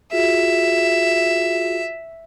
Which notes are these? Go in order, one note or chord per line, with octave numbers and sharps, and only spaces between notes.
F4 F#4 G#4 E5